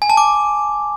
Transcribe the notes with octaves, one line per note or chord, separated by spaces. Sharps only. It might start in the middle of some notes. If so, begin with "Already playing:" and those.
G#5
A5
D6